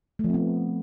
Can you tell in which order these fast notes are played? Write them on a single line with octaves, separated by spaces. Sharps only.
A3 F3 C4 B3